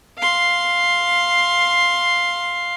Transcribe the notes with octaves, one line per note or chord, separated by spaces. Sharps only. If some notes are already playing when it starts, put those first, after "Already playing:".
F5 C6